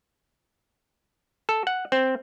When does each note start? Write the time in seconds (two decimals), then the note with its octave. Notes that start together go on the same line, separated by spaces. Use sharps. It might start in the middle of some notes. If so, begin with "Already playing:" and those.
1.49 A4
1.67 F#5
1.92 C4